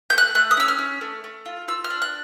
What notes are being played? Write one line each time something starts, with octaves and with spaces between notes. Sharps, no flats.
A3 G6
F#6
A3 F#6
D#6
C#4 E6
F6
C#4
A3
A3
F4
F4 E6
F6
D4
F#6